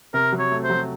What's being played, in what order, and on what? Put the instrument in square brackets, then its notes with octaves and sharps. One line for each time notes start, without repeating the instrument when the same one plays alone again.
[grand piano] C3 [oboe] A#4
[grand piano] F#3
[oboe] C#5
[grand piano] A3
[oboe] C5
[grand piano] F#3